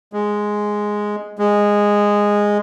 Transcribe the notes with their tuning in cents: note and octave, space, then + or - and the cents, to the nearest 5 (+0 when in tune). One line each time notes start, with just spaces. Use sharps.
G#3 +0
G#3 -10